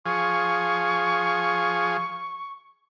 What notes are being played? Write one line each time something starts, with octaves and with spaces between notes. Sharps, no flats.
F3 G#4 C#6